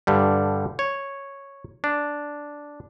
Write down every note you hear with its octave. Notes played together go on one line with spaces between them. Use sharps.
G2 D3 G3
C#5
D4